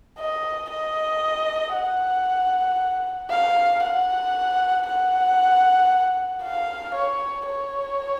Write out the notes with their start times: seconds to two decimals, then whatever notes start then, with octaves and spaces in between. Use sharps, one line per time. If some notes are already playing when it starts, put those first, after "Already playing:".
0.19 D#5
0.70 D#5
1.75 F#5
3.30 F5
3.83 F#5
4.87 F#5
6.43 F5
6.95 C#5
7.46 C#5